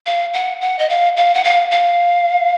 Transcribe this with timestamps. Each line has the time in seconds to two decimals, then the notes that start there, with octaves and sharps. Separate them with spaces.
0.06 F5
0.34 F#5
0.61 F#5
0.79 D#5
0.89 F5
1.17 F5
1.35 F#5
1.44 F5
1.71 F5